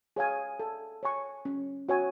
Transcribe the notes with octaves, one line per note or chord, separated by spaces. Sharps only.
G#4 C#5 F5 G#5
A4
C#5 G#5 C#6
C#4
F#4 C#5 G#5